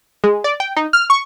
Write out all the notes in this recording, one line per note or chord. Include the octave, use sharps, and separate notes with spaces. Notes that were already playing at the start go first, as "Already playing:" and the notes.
G#3
D5
G5
D#4
F6
C#6